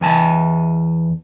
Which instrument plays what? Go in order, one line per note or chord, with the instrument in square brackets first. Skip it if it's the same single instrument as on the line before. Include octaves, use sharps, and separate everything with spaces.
[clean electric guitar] E2 G#5 A5